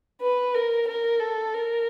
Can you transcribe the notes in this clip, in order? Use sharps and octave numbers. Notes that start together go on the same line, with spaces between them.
B4
A#4
A#4
A4
A#4